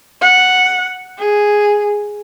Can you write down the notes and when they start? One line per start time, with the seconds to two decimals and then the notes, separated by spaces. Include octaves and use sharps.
0.21 F#5
1.18 G#4